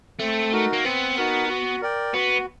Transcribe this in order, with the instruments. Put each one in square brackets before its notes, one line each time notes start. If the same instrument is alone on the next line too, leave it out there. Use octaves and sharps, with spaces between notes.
[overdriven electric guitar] A3 [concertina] C4
[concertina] D#4 F#4 A#4
[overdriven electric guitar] A#3
[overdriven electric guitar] B3 [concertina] C4
[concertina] D#4 F#4 A#4
F#4
A#4 D5 G5
[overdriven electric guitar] B3 [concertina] F#4